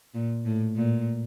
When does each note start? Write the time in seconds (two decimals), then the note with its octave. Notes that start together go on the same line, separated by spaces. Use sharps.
0.14 A#2
0.45 A2
0.76 A#2